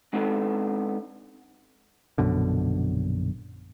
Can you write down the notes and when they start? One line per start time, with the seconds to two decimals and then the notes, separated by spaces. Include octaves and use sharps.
0.13 G#3 B3 C4 D4 D#4 A4
2.18 A#1 F#2 B2 D3